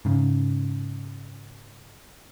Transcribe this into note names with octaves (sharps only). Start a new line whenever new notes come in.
G#2 C#3